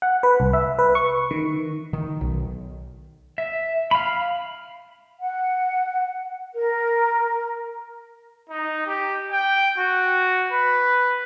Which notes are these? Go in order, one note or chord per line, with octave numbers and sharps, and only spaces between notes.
F#5
B4
C2
E5
B4
C#6
D#3
D#3
B1
E5
F5 B5
F#5
A#4
D#4
G4
G5
F#4
B4